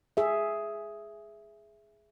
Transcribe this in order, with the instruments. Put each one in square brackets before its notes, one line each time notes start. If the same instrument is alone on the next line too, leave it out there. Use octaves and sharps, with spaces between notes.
[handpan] G#4 E5